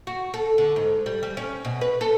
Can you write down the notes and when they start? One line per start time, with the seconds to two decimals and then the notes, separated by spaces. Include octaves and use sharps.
0.07 F#4
0.34 A4
0.58 D3
0.76 G#2
1.06 G3
1.23 G3
1.37 C#4
1.65 B2
1.81 B4
2.01 A4